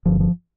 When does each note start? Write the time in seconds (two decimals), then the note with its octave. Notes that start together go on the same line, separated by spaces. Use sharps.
0.06 G1 G2 D3 F3
0.20 F3